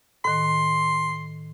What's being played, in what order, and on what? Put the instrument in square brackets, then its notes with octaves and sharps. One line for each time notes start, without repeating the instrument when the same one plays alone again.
[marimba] A2 D#3 [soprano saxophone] C6